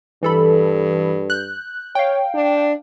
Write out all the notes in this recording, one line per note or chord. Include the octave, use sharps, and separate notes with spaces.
G2 E3 A4 B5
F#6 G6
C#5 F5 G5
D4